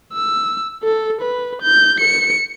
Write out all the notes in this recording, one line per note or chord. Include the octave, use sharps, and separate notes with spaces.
E6
A4
B4
G6
C#7